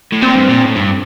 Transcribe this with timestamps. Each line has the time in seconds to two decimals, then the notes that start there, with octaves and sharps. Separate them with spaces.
0.13 A2
0.22 A#2 C4
0.36 G2
0.49 A#2
0.63 A2
0.76 G2